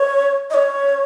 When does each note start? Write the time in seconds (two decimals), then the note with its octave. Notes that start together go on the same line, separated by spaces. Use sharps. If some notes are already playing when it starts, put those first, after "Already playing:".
Already playing: C#5
0.50 D#5
0.54 C#5